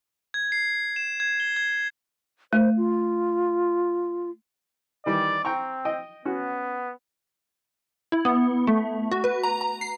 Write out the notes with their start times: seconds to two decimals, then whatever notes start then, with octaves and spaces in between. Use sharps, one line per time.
0.34 G#6
0.52 C7
0.96 E7
1.20 G#6
1.40 G7
1.56 G#6
2.53 A3 C5
2.77 F4
5.06 D#3 E3 G3 D5
5.45 C4 G5 A#5 C#6
5.85 D#5 G5
6.25 B3 C#4 F#4
8.12 E4
8.25 B3
8.67 A3
9.11 F#4
9.24 B4
9.43 A#5
9.61 A#5
9.81 C7